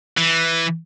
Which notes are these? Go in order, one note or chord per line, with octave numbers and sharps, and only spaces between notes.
E3